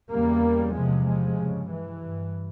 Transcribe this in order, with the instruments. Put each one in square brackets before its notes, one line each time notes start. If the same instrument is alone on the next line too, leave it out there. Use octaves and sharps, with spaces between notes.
[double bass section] E2 C#3 G3 A#3
E2 C3 F3 G#3
F3 G#3
G2 C#3
E3
G2